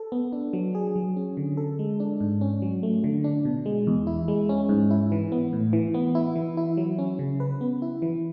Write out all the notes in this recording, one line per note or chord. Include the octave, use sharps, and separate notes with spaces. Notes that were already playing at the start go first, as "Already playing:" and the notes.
Already playing: A4
B3
D4
F#3
G#4
F#3
C#4
D3
A4
G#3
D4
G#2
C#4
F#3
A3
D3
D4
B2
G#3
E2
E4
G#3
C#4
G#2
E4
E3
B3
A2
E3
B3
E4
E3
E4
F#3
C#4
C#3
B4
B3
E4
E3